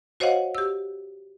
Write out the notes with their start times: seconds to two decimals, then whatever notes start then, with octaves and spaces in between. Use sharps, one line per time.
0.20 F#4 C5 C#5 D#5 F5 F#5
0.55 G4 E6